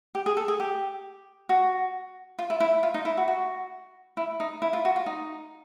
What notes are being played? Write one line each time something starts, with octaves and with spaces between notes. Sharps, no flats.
G4
G#4
A4
G#4
G4
F#4
F4
E4
E4
F4
D#4
E4
F#4
F#4
E4
D#4
E4
F4
F#4
F4
D#4